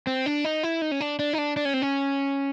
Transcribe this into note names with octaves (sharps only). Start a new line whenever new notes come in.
C4
D4
D#4
E4
D#4
C#4
D4
D4
D#4
D4
D4
C#4
C4
C#4